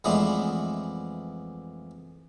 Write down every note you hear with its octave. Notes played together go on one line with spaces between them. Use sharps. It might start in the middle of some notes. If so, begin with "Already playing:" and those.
F2 E3 G#3 A3 B3 D4